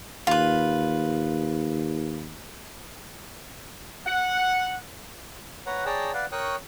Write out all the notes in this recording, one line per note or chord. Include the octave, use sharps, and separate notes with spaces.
D#2 F4 B4
F#5
B4 C#5 F#5 A#5
G#4 C#5 D5 G5 A5 A#5
B4 D5 F5 F#5
A#4 C#5 G5 C#6 D#6 F#6